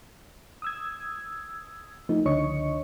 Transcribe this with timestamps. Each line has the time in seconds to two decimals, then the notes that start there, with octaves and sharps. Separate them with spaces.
0.62 D#6 E6 G#6
2.09 F3 A3 D#4
2.25 C#2 D3 C#5 D#5 C#6 C#7